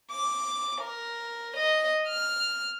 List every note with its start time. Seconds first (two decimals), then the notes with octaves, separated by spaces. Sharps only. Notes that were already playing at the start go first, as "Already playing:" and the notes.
0.11 D6
0.81 A#4
1.57 D#5
2.08 F6